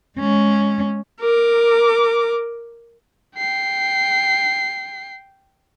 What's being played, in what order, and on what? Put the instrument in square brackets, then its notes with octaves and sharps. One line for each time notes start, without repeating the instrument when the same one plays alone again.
[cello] G#3 C#4
[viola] A#4 D6
[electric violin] G5 C7